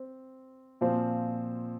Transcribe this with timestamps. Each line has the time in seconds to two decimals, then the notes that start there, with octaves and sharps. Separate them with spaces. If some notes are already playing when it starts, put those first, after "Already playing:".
Already playing: C4
0.81 A#2 F3 C4